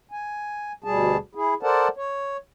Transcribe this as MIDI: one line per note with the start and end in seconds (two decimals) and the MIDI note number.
0.11 0.72 80
0.84 1.17 38
0.84 1.17 47
0.84 1.17 55
0.84 1.17 68
0.84 1.17 81
1.35 1.54 64
1.35 1.54 68
1.63 1.88 69
1.63 1.88 70
1.63 1.88 72
1.63 1.88 74
1.63 1.88 78
1.63 1.88 81
1.97 2.37 73